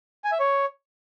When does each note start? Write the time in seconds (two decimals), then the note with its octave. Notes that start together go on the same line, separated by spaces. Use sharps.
0.24 G#5
0.32 E5
0.40 C#5